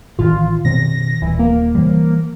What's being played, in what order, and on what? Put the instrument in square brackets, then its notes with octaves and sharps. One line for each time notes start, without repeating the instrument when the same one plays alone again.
[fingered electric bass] A1 D#3 E3 [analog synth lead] F4
[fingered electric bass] B2 D#3 C4 [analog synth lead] A#6
[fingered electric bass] D#1 [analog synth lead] E3
[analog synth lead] A#3
[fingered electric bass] E3 G3